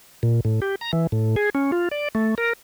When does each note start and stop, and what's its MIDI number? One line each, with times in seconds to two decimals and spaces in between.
0.23 0.40 46
0.45 0.60 45
0.62 0.75 67
0.81 0.91 82
0.93 1.07 52
1.12 1.36 45
1.36 1.50 68
1.55 1.71 61
1.72 1.89 65
1.91 2.08 74
2.15 2.35 57
2.38 2.53 70